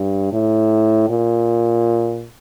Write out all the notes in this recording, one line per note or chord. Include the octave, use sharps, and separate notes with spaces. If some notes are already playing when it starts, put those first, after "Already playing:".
Already playing: G2
A2
A#2